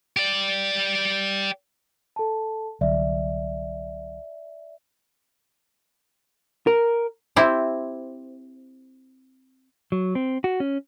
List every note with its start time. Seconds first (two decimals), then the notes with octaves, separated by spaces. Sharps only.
0.17 G4 D5
2.16 A4 A5
2.81 C2 D3 F#3 D5 E5
6.67 A#4
7.36 C4 E4 G4 C5
9.92 F#3
10.15 C4
10.44 F#4
10.60 C#4